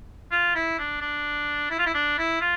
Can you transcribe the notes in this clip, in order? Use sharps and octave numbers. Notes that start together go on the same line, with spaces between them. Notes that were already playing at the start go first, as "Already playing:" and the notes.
F4
E4
D4
D4
E4
F4
E4
D4
E4
F4